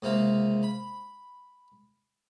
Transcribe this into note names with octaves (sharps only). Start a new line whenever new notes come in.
C#2 C3 A#3 F5
B5